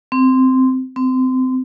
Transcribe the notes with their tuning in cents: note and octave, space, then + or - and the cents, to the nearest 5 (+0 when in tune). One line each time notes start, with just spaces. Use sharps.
C4 -10
C4 -25